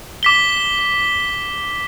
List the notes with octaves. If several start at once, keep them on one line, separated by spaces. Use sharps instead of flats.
D6 B6 G7